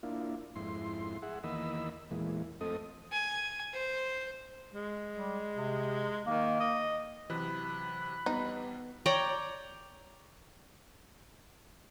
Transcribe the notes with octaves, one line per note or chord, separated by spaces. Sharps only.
A#3 D4 E4 F4
F2 G#2 E4 C6
G#4 E5 F#5
E2 D#3 A#3 D#5 B5 E6
E2 A#2 E3 G#3
F2 A3 C4 A4 D#5 D#6
G#5
C5
G#3
G3
C3
D#3 A#3
D#5
C3 E3 F#3 B5 F#6
F2 G3 B3 D#4 B4
C#5 D5 G5 A#5